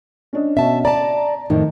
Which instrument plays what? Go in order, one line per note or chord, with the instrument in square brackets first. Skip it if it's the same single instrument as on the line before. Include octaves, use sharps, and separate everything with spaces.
[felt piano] C#4 D4 D#5
[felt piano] B2 C#4 [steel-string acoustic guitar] E5 A5
[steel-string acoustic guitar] D5 A5 [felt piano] A#5
[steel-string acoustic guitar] F2 A2 [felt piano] D#3